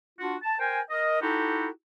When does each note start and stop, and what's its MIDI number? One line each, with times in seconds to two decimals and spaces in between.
0.19 0.36 62
0.19 0.36 65
0.19 0.36 66
0.43 0.59 81
0.60 0.80 70
0.60 0.80 72
0.60 0.80 79
0.60 0.80 80
0.90 1.21 70
0.90 1.21 75
1.22 1.68 63
1.22 1.68 64
1.22 1.68 66
1.22 1.68 67
1.22 1.68 69